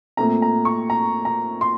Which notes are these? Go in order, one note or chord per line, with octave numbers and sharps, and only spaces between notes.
A#2 A3 C4 A#5
A#5
C#6
A#5
A#5
C6